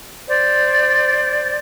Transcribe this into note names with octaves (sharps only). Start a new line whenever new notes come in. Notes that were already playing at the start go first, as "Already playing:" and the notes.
C5 D5